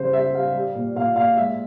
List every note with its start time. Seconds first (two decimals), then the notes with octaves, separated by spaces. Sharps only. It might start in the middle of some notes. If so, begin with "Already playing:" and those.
Already playing: C#3 G3 C5
0.13 G3 E5
0.34 G3 F5
0.54 G3
0.75 A#2
0.96 A#2 F5
1.16 A#2 F5
1.37 G#3 E5